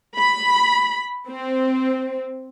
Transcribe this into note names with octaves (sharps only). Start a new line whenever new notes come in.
B5
C4